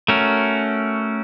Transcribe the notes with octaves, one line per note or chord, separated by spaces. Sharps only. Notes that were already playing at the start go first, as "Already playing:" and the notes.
A3 C#4 F#4 A#4